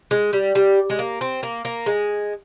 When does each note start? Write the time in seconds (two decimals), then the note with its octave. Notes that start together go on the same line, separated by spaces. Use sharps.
0.11 G#3
0.33 G3
0.55 G3
0.90 G#3
0.99 A#3
1.21 C4
1.43 A#3
1.65 A#3
1.86 G#3